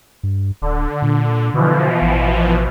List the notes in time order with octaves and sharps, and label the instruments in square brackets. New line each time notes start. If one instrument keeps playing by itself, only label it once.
[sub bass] G2
[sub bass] D1 [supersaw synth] D3
[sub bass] A#2
[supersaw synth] B2 E3 F3 [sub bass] D3
[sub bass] A1